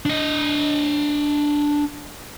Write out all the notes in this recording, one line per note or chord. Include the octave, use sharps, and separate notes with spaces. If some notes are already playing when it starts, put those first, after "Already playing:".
D4 D#5